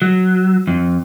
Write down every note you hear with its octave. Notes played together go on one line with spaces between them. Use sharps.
F#3
F2